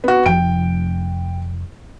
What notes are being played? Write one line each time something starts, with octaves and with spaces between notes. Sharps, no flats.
B3 F#4
F1 F3 G5 D7